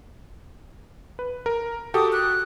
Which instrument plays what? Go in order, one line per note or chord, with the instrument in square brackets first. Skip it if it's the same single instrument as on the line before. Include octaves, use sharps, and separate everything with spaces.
[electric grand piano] B4
A#4
[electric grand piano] F#4 G4 A4 [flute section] A5 D6 D#6
[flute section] F#6